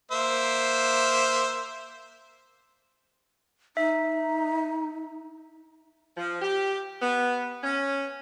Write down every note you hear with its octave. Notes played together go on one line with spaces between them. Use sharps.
A#3 C5 E5
D#4 E5
F3
G4
B3
C#4